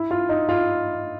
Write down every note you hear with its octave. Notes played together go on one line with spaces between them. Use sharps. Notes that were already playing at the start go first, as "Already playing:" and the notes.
Already playing: E4
F4
D#4
F4